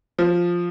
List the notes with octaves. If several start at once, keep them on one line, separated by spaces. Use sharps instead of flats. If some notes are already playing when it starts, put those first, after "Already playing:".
F3